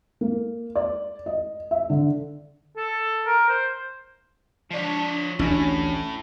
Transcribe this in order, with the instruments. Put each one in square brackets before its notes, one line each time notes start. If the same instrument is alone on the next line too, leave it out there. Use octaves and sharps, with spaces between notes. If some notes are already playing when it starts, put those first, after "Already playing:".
[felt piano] A#3
D5
D#5
E5
D3
[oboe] A4
A#4
C5
[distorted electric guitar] F3 C#5 [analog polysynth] D4 B6
[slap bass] A1 D2 D4 [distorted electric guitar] A2 [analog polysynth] C#4